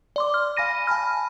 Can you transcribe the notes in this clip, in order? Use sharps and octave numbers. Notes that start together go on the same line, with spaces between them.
D5 C6 D6
F6
F5 G#5 B5 A#6 D#7
G#5 A5 B5 F6